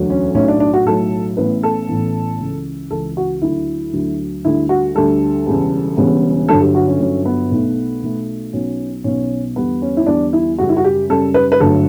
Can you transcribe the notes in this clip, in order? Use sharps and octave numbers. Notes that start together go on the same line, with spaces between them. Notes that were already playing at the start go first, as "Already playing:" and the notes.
Already playing: E1 D2 D3 F#3
C#4
B1 A2 F#3 C#4
D4
D4
F#4
B1 A2 F#3 A4
A1 A2 E3 B3 B4
A4
A1 A2 E3 B3
C#2 C#3 E3
C#2 C#3 E3 A4
F#4
D2 D3 F#3 E4
D2 D3 F#3
D2 D3 G3 E4
F#4
D2 D3 G3 A4
E1 E2 C#3 G3 B3
E1 E2 C#3 G3 B3
G1 G2 D3 F#3 A4
G4
F#4
C#4
G1 G2 D3 F#3 C#4
B3
B1 B2 A3
B1 B2 A3
B1 B2 F#3 B3 C#4
B1 B2 F#3 B3 C#4
E2 D3 G3 B3
C#4
E4
E2 D3 G3 B3 D4
E4
F#2 C#3 G3 F#4
E4
F#4
G4
F#2 C#3 G3 A4
B4
B4
G1 G2 F#3 A3 A4